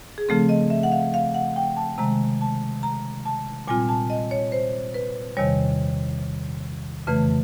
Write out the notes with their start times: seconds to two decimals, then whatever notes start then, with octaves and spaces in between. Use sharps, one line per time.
0.18 G#4
0.29 C#3 F3 A3 C4 A4
0.49 D#5
0.70 E5
0.83 F#5
0.92 F5
1.14 F5
1.35 F#5
1.56 G5
1.76 A5
1.98 C3 D#3 G#3 A#5
2.41 A5
2.83 A#5
3.26 A5
3.68 A#2 G3 C4 F4 G#5
3.89 A5
4.10 D#5
4.31 C#5
4.52 C5
4.94 B4
5.37 E2 C3 D#3 G3 C#5
7.07 F2 C#3 E3 A3 B4